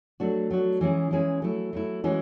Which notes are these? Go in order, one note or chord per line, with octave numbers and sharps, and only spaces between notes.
F#3 A3 D4 F#4
F#3 A3 D4 F#4
E3 G#3 C#4 E4 G#4
E3 G#3 C#4 E4 G#4
F#3 A3 E4
F#3 A3 E4
E3 G#3 C#4 F#4